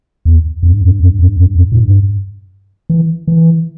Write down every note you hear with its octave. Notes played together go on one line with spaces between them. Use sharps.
E2
F2
G2
F2
G2
F2
G2
F2
G2
F2
G2
F2
A2
G2
E3
E3